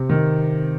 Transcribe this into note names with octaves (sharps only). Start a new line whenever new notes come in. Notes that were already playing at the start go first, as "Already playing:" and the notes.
Already playing: C3 C4
D#3